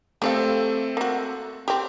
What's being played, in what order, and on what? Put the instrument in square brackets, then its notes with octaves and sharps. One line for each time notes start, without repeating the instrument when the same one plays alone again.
[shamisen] G3 C#5 F5 [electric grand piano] A3 C4 A4
[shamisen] A#3 F#4
C4 G4